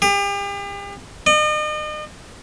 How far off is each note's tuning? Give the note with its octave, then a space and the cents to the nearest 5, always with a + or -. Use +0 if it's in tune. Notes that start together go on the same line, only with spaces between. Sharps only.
G4 +40
D#5 -40